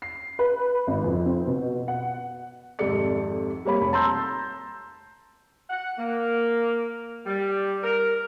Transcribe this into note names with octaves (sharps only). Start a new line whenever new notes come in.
C7
B4
G#1
F2
C4
B2
F#5
G#1 F2 C3 A4 D5 C#7
G3 A#3 C#5 B5
F1
A5 A#5 C6 E6 G6
F#5
A#3
G3
A#4